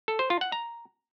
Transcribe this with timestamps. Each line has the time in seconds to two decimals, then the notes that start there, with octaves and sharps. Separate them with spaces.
0.08 A4
0.19 C5
0.30 F4
0.41 F#5
0.52 A#5